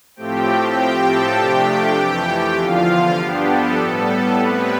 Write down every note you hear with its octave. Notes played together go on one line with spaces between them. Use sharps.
A2 F3 A3 C4 G4 G5
A2 F3 C4 G4 G5
A4 A5
C3 F3 A3 D4 G4 G5
F2 E3 A3
E2 D3 F3 F4 F5
G2 F3 B3 D4 G4
A4
A2 G3 B3
A4
A2 G3 B3 C4 B4